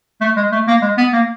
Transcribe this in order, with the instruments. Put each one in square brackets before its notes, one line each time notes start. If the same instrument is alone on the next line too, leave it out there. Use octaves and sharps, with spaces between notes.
[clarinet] A3
G#3
A3
A#3
G#3
B3
A#3